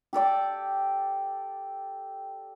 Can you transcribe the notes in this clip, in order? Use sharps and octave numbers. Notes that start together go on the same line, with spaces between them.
G4 A4 D5 G5